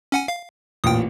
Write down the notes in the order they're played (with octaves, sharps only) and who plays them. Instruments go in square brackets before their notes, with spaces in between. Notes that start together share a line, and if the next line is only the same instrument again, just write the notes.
[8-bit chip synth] C#4 F#5 G#5
F5
[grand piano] A1 A#2 [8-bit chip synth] G5 D#6